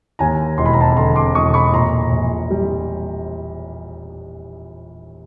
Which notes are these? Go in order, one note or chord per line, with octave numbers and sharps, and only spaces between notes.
D#2 G#5 A#5
E1 C6
B5
A#5
A5 B5
D3 A#5 C6
C6 D6
E1 C#6 D#6
B5 C#6
A#2 A#5 C6
A#1
G3